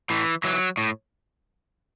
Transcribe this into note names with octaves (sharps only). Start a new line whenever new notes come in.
A2 E3
E3 F#3
A2